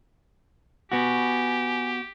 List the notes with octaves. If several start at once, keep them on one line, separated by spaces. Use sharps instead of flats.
B3 F#4 G4 G#5